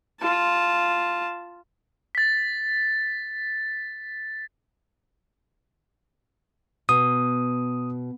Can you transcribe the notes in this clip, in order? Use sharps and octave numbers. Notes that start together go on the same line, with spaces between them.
F4 A5
A6 B6
B2 D#6